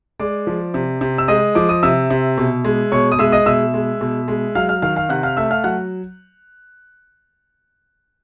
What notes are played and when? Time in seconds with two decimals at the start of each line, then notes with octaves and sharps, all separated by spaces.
0.19 G#3 D5 D6
0.47 F3
0.74 C3
1.01 C3
1.18 E6
1.28 G#3 D#5 D#6
1.55 F3 D6
1.69 D#6
1.83 C3 E5 E6
2.11 C3
2.38 B2
2.65 G#3
2.92 B2 C#5 C#6
3.12 D#6
3.19 G#3 E5 E6
3.32 D#5 D#6
3.46 B2 E5 E6
3.74 G#3
4.01 B2
4.28 G#3
4.55 F#3 F5 F6
4.69 F5 F6
4.82 D#3 F5 F6
4.96 F5 F6
5.09 C3 F#5 F#6
5.23 F5 F6
5.37 A3 E5 E6
5.51 F5 F6
5.64 F#3 F#5 F#6